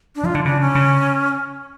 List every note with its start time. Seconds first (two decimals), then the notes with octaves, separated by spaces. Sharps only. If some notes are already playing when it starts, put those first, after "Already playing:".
0.15 D4
0.23 F3 F4
0.34 D3 D4
0.45 C#3 D4
0.61 C#4
0.75 C#3